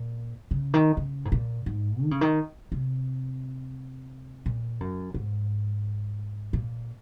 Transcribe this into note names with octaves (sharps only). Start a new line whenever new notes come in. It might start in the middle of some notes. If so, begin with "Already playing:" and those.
Already playing: A#2
C#3
D#3
C#3
G#2
A#2
G#2
D#3
C#3
D#3
C3
A#2
F#2
G#2
A#2